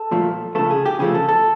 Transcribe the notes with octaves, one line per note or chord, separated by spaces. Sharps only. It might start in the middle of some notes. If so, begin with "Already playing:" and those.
Already playing: A4
A#2 F3 A3
C#3 F3 A3 A4
G#4
G4
C#3 F3 A3 G#4
A4
A4